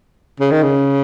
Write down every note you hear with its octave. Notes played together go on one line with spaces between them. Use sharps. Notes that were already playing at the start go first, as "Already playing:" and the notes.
C#3
D#3
C#3